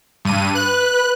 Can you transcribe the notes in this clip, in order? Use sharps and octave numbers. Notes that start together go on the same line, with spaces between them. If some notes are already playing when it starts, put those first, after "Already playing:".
G2 D#7
B4 F#6